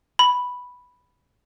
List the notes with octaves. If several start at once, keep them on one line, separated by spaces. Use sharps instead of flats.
B5